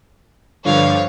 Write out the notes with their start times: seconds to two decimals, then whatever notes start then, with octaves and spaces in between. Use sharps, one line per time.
0.65 G2 D3 F3 C#5 F5